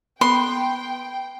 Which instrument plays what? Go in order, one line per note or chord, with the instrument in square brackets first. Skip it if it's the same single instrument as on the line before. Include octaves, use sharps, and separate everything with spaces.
[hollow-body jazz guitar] B3 [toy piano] A4 B5 [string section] G5 [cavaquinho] C6